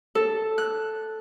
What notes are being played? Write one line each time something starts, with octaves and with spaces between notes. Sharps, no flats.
A4
F#6